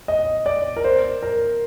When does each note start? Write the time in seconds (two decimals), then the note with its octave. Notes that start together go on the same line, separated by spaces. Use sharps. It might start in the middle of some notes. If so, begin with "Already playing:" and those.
0.08 D#5
0.46 D5
0.77 A#4
0.84 C5
1.23 A#4